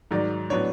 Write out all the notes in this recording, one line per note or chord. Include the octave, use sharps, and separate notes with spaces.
G#2 D#3 F#3 D5
A2 F#3 B3 D4 C#5